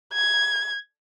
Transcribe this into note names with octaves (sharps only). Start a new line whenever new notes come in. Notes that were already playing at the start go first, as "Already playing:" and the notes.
G#6